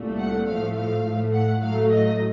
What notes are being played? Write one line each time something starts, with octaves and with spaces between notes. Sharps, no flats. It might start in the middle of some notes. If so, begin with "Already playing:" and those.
Already playing: C2 A#2 A3
F#5
A2 F3 A3 F5
F5
A2 A3
F#5
A2 F#3 A3 F5
D#5